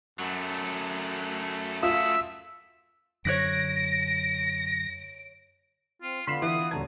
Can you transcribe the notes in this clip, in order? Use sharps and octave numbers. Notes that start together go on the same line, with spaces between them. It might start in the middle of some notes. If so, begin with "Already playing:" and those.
F#2 F#3 A3
F4 E5 D#6 E6
F#2 D3 C#5 F#6 A#6 B6 D7
C4 F4
D3 B3 F4 B5 C6 C7 E7
E3 D#6
D#1 D3 F#4 A5 A#5 G#6